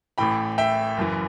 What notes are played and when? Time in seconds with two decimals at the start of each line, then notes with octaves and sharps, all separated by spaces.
0.18 A1 A2 E3 G5 B5
0.58 E5 G5
0.97 F#1 F#2 E3